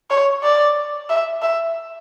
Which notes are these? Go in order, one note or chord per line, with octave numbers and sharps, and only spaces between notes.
C#5
D5
E5
E5